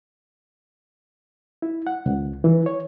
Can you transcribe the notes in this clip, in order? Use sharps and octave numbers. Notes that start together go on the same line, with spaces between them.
E4
F#5
C#2
E3
C#5